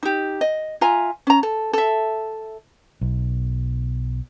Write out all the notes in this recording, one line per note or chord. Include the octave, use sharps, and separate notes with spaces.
D#4 G4
D#5
F4 E5 G#5 A#5
C#4 A#5
A4
A4 E5
B1